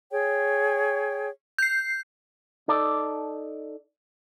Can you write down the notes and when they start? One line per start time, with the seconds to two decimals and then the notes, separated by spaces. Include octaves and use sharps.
0.12 G#4 C#5 G5
1.58 G6 C7
2.68 D#4 A4 D5